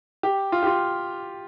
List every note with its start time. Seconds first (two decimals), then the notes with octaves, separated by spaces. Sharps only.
0.23 G4
0.52 F4
0.63 G4
0.67 F4